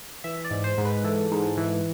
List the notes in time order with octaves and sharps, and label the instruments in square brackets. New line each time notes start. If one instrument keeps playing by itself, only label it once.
[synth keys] E3 E5
D5
G#2
C5
G#2
B4
E3 A4
G#2
E3